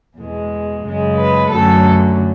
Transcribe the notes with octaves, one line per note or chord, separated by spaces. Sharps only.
E2 B2 G#3
F#2 C#3 G#3
B4
F#2 D3 F#3 A3 A4